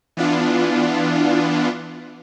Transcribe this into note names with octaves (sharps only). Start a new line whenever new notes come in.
E3 B3 D4 F4